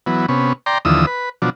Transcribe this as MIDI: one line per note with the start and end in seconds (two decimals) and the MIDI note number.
0.06 0.26 52
0.06 0.26 54
0.06 0.26 59
0.29 0.53 48
0.29 0.53 59
0.29 0.53 61
0.66 0.78 74
0.66 0.78 79
0.66 0.78 82
0.66 0.78 84
0.85 1.06 39
0.85 1.06 50
0.85 1.06 52
0.85 1.06 53
0.85 1.06 87
0.85 1.06 88
1.07 1.29 71
1.42 1.50 47
1.42 1.50 53
1.42 1.50 54
1.42 1.50 62